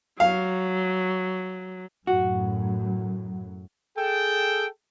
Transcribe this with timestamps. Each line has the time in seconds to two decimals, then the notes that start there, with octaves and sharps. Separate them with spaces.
0.20 F#3 F5
2.07 F#2 A2 F#3 F#4
3.96 G#4 A4 G5